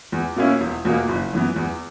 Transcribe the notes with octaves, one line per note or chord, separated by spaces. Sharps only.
E2
B2 A#3 C#4 E4
E1
E2 B2 A#3
F#1
F#2 E3 B3
E2